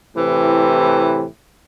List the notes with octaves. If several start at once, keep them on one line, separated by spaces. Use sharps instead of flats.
A2 C3 E3